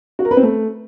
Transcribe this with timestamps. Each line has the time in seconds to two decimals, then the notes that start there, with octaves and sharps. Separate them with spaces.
0.19 F#4
0.25 A#4
0.31 B4
0.37 C4
0.43 A3